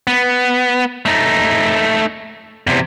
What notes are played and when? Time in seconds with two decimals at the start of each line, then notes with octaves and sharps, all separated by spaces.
0.07 B3
1.05 A3 D#4
2.67 E2 C3